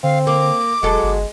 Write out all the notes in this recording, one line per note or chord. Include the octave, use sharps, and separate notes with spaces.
D3 C4 F5
A#3 D6
E1 F#3 G#3 A4
G1